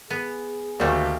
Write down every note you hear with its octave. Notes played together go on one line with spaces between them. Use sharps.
B3 G#4
D2 D#3 G3 A3 A#3